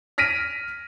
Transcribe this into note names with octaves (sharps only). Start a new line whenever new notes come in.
F6 A#6 B6 D7 D#7